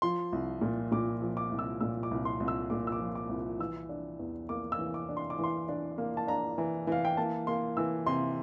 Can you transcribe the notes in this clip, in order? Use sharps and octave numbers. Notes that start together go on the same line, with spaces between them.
F3 C6
C2
A#2
A#2 D6
F3
D6
C2
E6
A#2 E6
D6
C2
C6
C2
E6
A#2 D6
E6
D6
F3
D6
C2
E3 E6
D4
E2
A#3 D6
E6
E3
D6
D4
C6
D6
E3
C6
D4
A#3
A5
D4 A#5
E3
E3 F5
G5
A#3 A5
A#3 C6
E3 E6
C3 C6